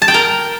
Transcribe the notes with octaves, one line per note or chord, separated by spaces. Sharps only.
A5
G5
A#4